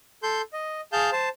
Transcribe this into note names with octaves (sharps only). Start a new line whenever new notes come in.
A4 C6 G6
D#5
G#4 F5 A5 G6
C5 A5